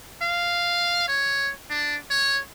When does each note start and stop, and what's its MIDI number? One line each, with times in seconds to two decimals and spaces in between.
0.22 1.07 77
1.08 1.52 73
1.70 1.96 62
2.10 2.40 73